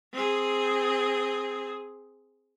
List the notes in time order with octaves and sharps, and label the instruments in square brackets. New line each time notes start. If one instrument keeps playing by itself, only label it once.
[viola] C4 G#4